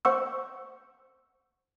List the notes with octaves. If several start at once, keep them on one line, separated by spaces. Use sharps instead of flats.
C5 F#5 C#6 E6